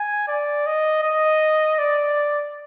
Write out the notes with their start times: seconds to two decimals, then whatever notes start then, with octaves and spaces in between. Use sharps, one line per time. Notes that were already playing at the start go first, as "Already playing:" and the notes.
Already playing: G#5
0.28 D5
0.66 D#5
1.03 D#5
1.79 D5